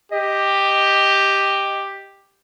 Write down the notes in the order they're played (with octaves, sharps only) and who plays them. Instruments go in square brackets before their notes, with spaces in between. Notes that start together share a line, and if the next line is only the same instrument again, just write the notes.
[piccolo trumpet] G4 [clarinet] D#5